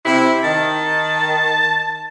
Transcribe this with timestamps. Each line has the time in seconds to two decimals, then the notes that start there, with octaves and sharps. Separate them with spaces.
0.05 C3 E4
0.44 D#3 A5